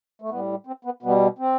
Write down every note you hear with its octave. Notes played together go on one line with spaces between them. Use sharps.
A3
A2 G3 B3
C4
B3
B2 G3 B3
C4